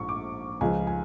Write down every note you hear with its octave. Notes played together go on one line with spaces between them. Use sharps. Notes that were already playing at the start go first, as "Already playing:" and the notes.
Already playing: A#1 G#2 C#6
D6
C#2 C#3 F3 G#5
G#5